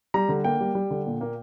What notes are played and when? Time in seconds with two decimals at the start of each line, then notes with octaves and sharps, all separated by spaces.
0.14 G3 A#5
0.29 D3
0.44 A#3 G5
0.61 G3
0.75 G3
0.91 D3
1.06 A#2
1.21 A#3